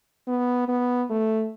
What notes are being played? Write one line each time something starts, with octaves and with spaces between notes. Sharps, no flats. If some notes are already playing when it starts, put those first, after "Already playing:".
B3
B3
A3